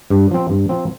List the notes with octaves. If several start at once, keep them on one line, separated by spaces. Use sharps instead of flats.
G2
F3 C4
G2
F3 C4